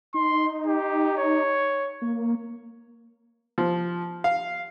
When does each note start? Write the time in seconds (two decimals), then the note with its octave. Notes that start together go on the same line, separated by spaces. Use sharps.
0.14 D#4 C6
0.67 G4
1.18 C#5
2.02 A#3
3.58 F3
4.24 F5